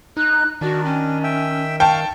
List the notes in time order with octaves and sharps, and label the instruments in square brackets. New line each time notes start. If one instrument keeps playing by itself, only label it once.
[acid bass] D#4 [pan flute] F#6
[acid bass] D#3 [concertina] D4 [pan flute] F#4
[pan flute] C#4
[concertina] E5 G5
[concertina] F5 C#6 [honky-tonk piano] G5 A5